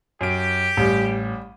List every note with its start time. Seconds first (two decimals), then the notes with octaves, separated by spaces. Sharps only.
0.21 F#2 G4 D7
0.77 A1 G3